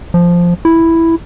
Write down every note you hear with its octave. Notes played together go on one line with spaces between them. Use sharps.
F3
E4